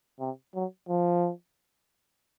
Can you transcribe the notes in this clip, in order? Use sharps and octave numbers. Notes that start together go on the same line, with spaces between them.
C3
F#3
F3